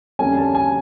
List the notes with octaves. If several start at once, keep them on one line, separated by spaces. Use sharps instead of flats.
F2 D3 G3 A#3 C#4 G#5
A5
G#5